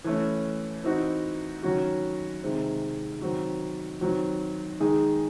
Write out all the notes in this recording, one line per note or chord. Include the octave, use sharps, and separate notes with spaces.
E3 A3 C#4
E3 C4 D#4 F#4
D#3 F#3 C#4 F#4
C3 D#3 G#3 C4
D#3 F#3 C4 F#4
D#3 F#3 C4 F#4
D#3 G#3 D#4 G#4